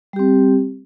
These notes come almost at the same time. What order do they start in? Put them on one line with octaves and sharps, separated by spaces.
G3 G4 C4